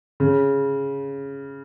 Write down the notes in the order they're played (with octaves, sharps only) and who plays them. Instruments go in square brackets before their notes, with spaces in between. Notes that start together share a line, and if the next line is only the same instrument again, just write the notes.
[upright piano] C#3